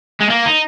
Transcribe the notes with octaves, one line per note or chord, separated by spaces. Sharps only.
G#3
A#3
D#4